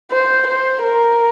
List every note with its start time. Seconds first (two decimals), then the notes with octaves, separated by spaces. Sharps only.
0.11 C5
0.48 C5
0.83 A#4